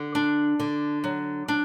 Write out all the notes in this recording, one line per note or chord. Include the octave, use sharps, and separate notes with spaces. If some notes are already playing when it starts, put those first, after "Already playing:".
Already playing: D3
D4
D3
F#3
D4